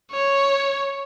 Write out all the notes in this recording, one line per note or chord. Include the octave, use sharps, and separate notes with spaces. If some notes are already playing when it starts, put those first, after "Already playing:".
C#5